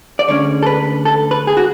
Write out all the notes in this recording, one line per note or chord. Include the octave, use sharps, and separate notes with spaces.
D5
D2 D3 G#3 C#4 C#5
A4
B4
A4
B4
G#4
F#4